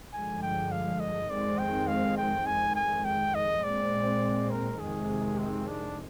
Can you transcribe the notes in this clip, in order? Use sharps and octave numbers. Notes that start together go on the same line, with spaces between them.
G2 D3 F3 G#3 G#5
G5
F5
D#5
F2 D#3 G#3 C4 D5
G5
F5
G5
F2 D#3 G#3 G#5
G#5
G5
D#5
A#2 G#3 C4 D5
A#4
F2 C3 D#3 G#3 G#4
C4
D4